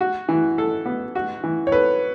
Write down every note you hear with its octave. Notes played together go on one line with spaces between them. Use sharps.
F#4
E3
A4
B3
F#4
E3
C#5
A4 B4